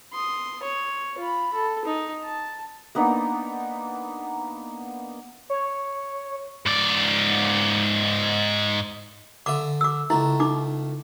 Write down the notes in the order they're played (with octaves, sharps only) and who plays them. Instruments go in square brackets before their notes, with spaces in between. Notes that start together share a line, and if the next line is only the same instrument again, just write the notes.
[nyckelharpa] C6 D#6
C#5
F4 B5
A4
D#4
A5
[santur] A#3 B3 D4 D#4
[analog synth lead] C#5
[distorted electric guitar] G#2 D5
[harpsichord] D3 E5 [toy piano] D6
[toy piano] D6 E6
[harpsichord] C#2 A3 [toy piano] E4
[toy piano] D#4 D6